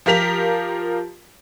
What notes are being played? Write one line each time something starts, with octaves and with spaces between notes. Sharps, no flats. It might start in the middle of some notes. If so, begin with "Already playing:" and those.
F3 F4 G4 A#4 B6 F7